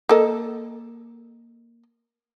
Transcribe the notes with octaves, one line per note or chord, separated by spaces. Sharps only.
A#3 A4 D#5